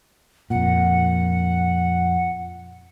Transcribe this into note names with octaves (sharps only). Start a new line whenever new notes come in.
F2 A#2 F#5